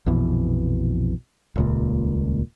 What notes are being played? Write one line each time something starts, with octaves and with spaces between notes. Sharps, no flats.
A#1 F2 B2 E3
D#1 C#2 A#2